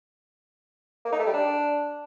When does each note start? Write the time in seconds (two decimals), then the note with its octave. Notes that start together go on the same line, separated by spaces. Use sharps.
1.05 A#3
1.12 D#4
1.19 A3
1.26 G3
1.33 D4